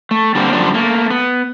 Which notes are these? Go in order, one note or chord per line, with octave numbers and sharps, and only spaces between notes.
A3
D3 G3 A#3 C4
F#2 D3 F3 G3 D4
A3 A#3
B3